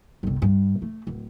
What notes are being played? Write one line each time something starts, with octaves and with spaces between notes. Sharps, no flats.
G1 C2
G2
A3
D1